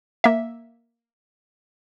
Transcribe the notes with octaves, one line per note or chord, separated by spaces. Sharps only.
A#3 E5